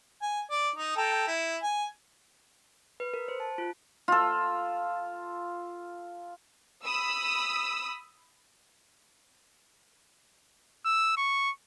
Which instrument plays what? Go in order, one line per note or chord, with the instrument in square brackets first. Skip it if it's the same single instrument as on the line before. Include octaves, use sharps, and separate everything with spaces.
[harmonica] G#5
D5
D#4
A4 G5 A#5
E4
G#5
[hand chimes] B4
A#4
C5
A5
F4
[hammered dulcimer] F4 A4
[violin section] B5 D#6 E6
[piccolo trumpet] E6
C#6